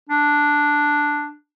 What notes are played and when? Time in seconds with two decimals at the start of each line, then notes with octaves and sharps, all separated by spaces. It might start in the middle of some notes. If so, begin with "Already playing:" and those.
0.10 D4